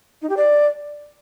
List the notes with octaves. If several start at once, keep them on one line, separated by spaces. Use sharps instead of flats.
D#4
G4
D5